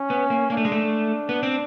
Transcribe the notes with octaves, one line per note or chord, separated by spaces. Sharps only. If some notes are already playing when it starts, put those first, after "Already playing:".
Already playing: C#4
B3
A#3
A#3 D4
A3
G#3
A3
B3
C4